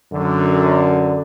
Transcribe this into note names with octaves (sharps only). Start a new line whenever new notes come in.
F#2 D3